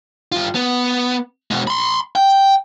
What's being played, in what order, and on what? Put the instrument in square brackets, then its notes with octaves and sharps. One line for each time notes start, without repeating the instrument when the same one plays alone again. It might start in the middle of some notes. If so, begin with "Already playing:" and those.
[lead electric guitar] G2 F4
B3
B2 G#3
B5 C6
G5